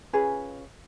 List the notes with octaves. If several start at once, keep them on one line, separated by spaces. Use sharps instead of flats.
C#4 F4 G#4 B4